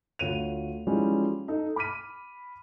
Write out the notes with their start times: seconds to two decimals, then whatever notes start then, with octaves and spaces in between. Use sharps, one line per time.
0.19 D2 F4 C#5 D#7 F7
0.87 E3 F3 G3 G#3 C#4 D#4
1.48 D#4 A4
1.76 B5 D6 F6 B6 D#7